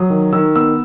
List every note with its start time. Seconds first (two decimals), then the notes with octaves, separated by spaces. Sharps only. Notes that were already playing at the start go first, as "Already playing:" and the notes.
Already playing: F#3 D#6
0.10 D#3
0.33 D#3 E6
0.56 B3 E6